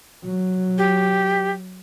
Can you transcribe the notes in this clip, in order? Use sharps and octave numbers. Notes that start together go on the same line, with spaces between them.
F#3
G4